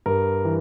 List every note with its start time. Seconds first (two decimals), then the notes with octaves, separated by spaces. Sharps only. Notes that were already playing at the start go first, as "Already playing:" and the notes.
0.06 G2 A#4
0.45 E3